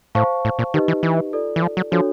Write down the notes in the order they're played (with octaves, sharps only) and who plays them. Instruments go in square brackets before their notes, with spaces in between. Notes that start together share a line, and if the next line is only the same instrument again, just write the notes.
[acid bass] A2 [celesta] C5 F5 A5 C#6
[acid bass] A2
A#2
[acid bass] D#3 [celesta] D#4 G4 B4 D#5
[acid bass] E3
E3
[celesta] F4 A4 D5
[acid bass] E3
F3
F#3
[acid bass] F3 [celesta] D4 F#4 A4 C#5